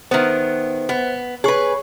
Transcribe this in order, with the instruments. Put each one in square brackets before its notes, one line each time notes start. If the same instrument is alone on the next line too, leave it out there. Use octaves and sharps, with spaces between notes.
[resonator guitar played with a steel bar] D#3 B3 [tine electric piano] C5 E5
[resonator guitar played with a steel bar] B3
[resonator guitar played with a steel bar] G#4 B4 [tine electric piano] C#5 C#6